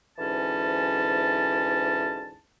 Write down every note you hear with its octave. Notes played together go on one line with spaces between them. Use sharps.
D2 G#2 E3 C#4 A5